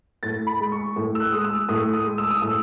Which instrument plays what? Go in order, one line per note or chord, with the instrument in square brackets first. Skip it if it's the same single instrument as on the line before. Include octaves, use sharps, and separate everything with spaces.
[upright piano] A2 A6
B5
G#3
C#6
A2
E6
F#6
G#3 D#6
E6
A2 D#6
D#6
G#3
E6
D#6
A2 E6